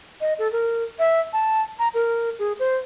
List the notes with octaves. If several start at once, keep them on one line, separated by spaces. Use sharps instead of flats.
D#5
A4
A#4
E5
A5
A#5
A#4
G#4
C5